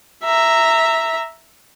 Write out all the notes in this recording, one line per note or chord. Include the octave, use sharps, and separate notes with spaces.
E5 A#5